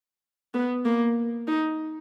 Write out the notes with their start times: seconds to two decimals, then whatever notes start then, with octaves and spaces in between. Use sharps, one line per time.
0.54 B3
0.85 A#3
1.47 D#4